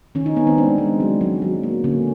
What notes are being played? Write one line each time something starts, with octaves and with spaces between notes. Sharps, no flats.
D#3 C#4
D#4
D#3 B3
C4
G#3 D4
G#3
F#3
F#3
F#3
A#3
D3 C#4